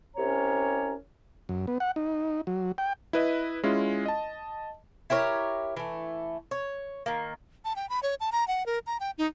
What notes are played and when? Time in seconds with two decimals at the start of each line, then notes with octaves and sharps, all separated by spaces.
0.17 C2 C3 C#4 C#5 A#5
1.49 F#2
1.67 B3
1.80 F#5
1.96 D#4
2.47 F#3
2.78 G5
3.13 E4 B4 D#5
3.63 G#3 C#4 E4 F4
4.06 D#5 A5
5.10 E4 G4 A#4 C#5
5.77 E3 A3
6.51 C#5
7.06 D#3 A#3
7.65 A5
7.76 G5
7.89 B5
8.03 C#5
8.20 A5
8.32 A#5
8.48 F#5
8.66 A#4
8.87 A#5
9.00 G5
9.18 D#4